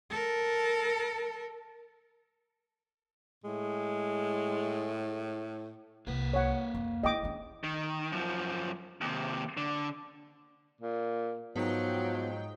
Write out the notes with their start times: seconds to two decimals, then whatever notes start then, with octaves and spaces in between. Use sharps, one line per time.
0.10 A4 A#4
3.44 A2 G#3
6.07 C2 A#3 B4
6.34 C#5 F#5
6.74 F2
7.03 D4 E4 D#5 G5 D6
7.23 C#4 D4
7.64 D#3
8.12 F#2 F3
9.01 D#2 C3
9.57 D3
10.81 A#2
11.56 G#2 F3 F#3 B3 D#4 G5